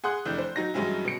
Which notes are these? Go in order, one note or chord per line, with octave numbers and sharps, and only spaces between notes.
G#4 F#5 C6 D#6 F#6
F1 E3 D4 G6
C5
F#3 D#4 A#6
G2 E3 F#3 G#3 C#4 E4
B2 C#7